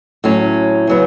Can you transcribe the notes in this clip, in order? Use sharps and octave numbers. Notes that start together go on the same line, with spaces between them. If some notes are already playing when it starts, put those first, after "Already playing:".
A2 F#3 C#4
C#3 F#3 B3